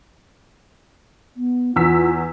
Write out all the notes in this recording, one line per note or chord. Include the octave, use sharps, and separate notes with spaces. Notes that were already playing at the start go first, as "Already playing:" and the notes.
B3
E2 F4 E6 B6